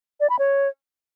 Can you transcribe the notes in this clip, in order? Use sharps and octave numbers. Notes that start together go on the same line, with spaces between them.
D5
B5
C#5